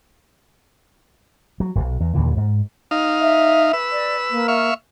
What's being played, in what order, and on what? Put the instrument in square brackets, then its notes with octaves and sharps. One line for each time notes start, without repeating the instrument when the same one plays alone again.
[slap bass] F#3
E1 B1
E2
D#2 A#2 D3 E3
G#2
[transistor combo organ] D#4 F5
[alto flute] E5
[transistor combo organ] B4 E6
[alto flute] D5
A#3
[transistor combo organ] E5 F5 C#6